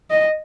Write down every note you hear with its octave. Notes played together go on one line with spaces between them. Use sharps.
D#5